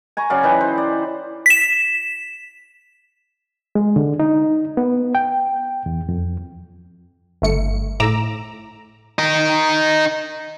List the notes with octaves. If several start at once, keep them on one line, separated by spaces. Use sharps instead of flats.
G#5 A#5 C#6
C#3 F#3 D5 F5
E3 D#4 B4 G5
C5
D5
B6 E7
G#3
D3
D#4
B3
G5
E2
F2
G1 A3 C#7
A2 A#5 D6 E6
D#4 A#4